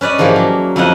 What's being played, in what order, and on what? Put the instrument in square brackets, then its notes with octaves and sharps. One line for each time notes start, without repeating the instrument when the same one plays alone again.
[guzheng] C#4 B4 D5 D#5
G#2 E3 F3 A#3 G4
F#3
F2 E4 F4 C#5 D#5 F#5